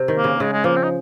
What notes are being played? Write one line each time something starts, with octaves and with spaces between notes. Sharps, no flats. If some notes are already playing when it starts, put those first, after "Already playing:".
Already playing: C3
D#3
A#3
C#3
C#3 G#3
G#3
F3 A#3
C4
D#4